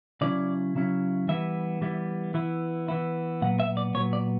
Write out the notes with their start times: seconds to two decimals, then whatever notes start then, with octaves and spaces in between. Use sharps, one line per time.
0.21 C#3 F#3 C#4 E4 D5
0.75 C#3 F#3 C#4 E4
1.28 E3 G3 B3 E4 E5
1.81 E3 G3 B3 E4
2.34 E3 B3 E4
2.88 E3 B3 E4
3.41 A#2 F#3 B3 F#5
3.60 E5
3.77 D5
3.94 A#2 F#3 B3 C#5
4.13 D5